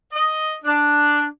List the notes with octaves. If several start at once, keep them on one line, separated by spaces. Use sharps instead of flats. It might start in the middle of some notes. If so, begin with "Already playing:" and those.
D#5
D4